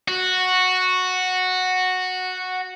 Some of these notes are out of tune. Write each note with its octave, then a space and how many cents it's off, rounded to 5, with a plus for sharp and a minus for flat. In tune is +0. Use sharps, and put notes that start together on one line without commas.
F#4 -5